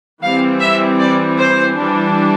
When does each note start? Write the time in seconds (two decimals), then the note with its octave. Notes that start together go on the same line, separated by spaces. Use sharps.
0.22 E3 G3 C4 F5
0.61 E5
0.99 D5
1.37 C5
1.75 E3 G3 D4